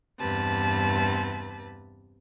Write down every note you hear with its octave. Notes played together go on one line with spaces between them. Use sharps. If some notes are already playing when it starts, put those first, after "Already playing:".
E2 G2 C3 B4 A5